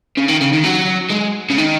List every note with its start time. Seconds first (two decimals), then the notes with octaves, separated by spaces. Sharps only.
0.17 C#3
0.28 D#3
0.41 C#3
0.52 D#3
0.64 F#3
1.11 G#3
1.50 C#3
1.58 D#3